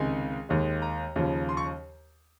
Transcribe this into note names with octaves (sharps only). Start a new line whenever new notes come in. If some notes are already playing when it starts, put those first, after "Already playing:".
Already playing: C#2 C3 D#3 G#3 G#5
D#2 D#3 G#3
A#5
D#2 C#3 F3
C6
C#6